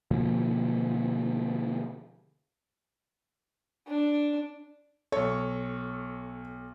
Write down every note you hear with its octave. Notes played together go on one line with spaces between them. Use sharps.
B2 D3 F3 A#3
D4
B1 A4 C#5